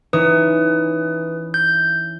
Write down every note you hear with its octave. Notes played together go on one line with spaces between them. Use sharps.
E3 C#4 D#4 B4 D#6
G6